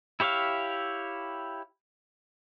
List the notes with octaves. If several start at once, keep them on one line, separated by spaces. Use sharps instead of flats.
E4 G4 C#5 E5 F5